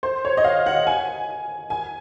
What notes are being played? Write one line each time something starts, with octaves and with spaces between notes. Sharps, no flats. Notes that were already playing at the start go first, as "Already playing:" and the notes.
C5
C#5
D#5
F5
F#5
G#5
G#5